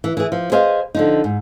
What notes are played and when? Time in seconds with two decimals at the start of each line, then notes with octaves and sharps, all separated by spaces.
0.04 E3
0.17 E3 G#4
0.32 F3
0.52 G#4 B4 C5 D#5 F5
0.95 D3 F3 D#4
1.24 G#2